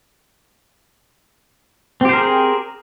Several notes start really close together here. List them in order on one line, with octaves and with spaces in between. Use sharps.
C4 G4 C5 A#4 G#4